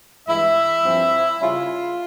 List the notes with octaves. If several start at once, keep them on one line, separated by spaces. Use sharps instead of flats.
G2 E3 G#3 E4 E5
G2 F3 C4
C#3 G3 C#4 E4 F4